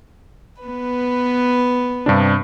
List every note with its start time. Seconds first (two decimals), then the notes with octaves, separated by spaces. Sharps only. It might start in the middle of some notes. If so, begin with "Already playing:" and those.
0.61 B3 B4
2.06 G2 C3 D4